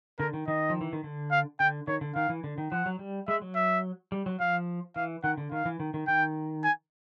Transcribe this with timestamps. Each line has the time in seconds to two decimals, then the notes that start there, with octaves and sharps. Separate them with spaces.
0.19 D3 A#4
0.34 D#3
0.48 D#3 D#5
0.70 F3
0.81 E3
0.93 D#3
1.04 D3
1.31 F5
1.59 D3 G5
1.88 D#3 C#5
2.01 D3
2.15 D#3 F5
2.29 E3
2.44 D3
2.58 D#3
2.72 F3 F#5
2.86 F#3
2.99 G3
3.28 G#3 E5
3.42 F#3
3.55 E5
4.12 G3
4.26 F#3
4.40 F3 F5
4.96 E3 F5
5.24 D#3 F#5
5.38 D3
5.52 D#3 F5
5.66 E3
5.80 D#3
5.94 D#3
6.07 D#3 G5
6.64 G#5